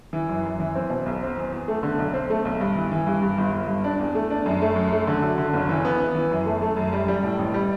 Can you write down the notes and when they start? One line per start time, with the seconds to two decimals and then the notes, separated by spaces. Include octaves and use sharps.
0.13 E3
0.29 F#2
0.45 F#2
0.60 E3
0.75 C4
0.90 B2
1.06 B1
1.22 C4
1.37 E2
1.52 E2
1.68 A3
1.83 D3
1.98 B1
2.14 C4
2.30 A3
2.45 B1
2.60 G2
2.75 E3
2.92 E3
3.07 G2
3.22 G2
3.38 G1
3.52 G1
3.68 G2
3.84 D4
3.99 E2
4.15 A3
4.30 D4
4.46 F#2
4.61 A3
4.76 F#2
4.92 A3
5.07 D3
5.22 F#3
5.38 D3
5.53 F#1
5.69 E3
5.85 B3
6.00 B3
6.15 E3
6.31 F#2
6.46 A3
6.62 A3
6.76 F#2
6.93 G3
7.08 G3
7.23 A2
7.39 A1
7.54 G3